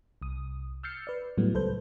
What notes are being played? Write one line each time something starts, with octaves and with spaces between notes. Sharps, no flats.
C2 D#6
E6 F6 G6 A6 C7 C#7
B4 D5
A2 F#3 G3 A3 B3
C#2 A4 B4 C5 G6